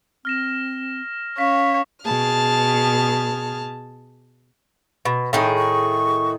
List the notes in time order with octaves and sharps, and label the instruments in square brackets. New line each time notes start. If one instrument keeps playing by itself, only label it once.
[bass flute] C4 [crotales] F6 A#6 E7
[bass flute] C#4 [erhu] C#5 [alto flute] F5 [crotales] B6
[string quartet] B2 G#4 A5 F6
[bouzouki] B2
A2 D#3 G#4
[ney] C#6